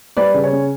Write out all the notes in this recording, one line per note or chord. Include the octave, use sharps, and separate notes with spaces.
G3 B4 D5
C#3
C#5
C#4